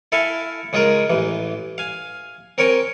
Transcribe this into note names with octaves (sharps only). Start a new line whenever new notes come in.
E4 A4 E5 F5 G#5
C#3 G#3 F4 G#4 A#4
A1 E3
F5 G#5
C4 A#4 C#5 G5 G#5 A#5